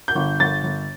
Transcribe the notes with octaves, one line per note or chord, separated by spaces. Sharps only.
G6
G1
G1 A6
G1